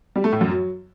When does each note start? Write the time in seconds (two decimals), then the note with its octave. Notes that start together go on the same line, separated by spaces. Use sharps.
0.16 G3
0.24 A3
0.33 A2
0.41 F#2
0.49 F#3